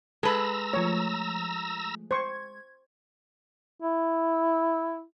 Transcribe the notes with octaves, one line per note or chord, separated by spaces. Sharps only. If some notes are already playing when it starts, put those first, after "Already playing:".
G#3 A4 B4 A#5 E6
F3 A3 C#5
C5 C#6 G#6
E4